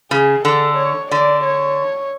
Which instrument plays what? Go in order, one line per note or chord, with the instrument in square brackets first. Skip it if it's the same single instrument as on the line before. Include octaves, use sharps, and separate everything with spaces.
[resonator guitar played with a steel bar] C#3 [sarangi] G#4
[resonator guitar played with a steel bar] D3 [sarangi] A4
[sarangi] C#5
[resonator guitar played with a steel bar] D3 [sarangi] D5
[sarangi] C#5